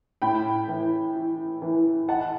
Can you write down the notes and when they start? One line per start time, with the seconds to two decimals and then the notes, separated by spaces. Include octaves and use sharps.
0.22 A2 G5 B5
0.68 E3
1.15 E4
1.62 E3
2.08 D#4 F#5 A5